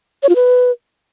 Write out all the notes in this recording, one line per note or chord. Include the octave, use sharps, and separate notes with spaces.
C#5
F4
B4